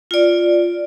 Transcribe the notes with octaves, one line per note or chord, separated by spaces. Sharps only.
F4 D5